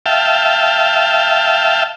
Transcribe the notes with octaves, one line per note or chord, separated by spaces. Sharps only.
E5 F5 G5 A5